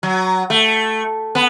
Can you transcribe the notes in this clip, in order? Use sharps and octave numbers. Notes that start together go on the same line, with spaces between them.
F#3
A3
B3